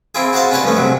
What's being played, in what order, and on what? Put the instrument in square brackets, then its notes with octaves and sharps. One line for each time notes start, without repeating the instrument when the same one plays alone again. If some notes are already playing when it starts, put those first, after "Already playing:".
[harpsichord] C4 E4 F4 G#4
F#4 G#4 C5 F5 A5
C#4 D4 G4 B4 C#5 A5
G2 F3 A3 C#4
C3 F#3